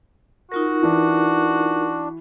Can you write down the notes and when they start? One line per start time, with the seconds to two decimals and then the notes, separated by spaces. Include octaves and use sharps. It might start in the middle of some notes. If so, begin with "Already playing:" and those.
0.52 D#4 F4 F#4 A#4
0.83 E3 D4